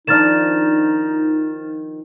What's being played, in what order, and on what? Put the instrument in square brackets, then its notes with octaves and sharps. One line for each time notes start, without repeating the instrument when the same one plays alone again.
[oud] D#3 F3 D4 [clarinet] D#4 [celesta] F6 A6 E7